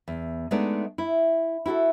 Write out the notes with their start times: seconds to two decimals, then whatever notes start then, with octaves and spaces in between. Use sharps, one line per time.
0.08 E2
0.51 G#3 A3 B3 D4 D#4 D5
0.98 E4
1.66 E4 F#4 G4 A4